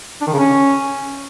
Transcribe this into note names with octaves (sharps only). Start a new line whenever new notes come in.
D4
D#3
C#3
C#4